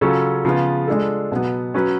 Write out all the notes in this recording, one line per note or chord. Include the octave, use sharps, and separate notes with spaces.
C#3 F#3 C#4 F4 A4
C#3 F3 B3 F4
G#3 D4 F4 A4
B2 F#3 B3
F#3 C#4 F#4 B4